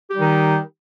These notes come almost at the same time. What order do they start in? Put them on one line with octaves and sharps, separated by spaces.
G4 G3 D#4 D#3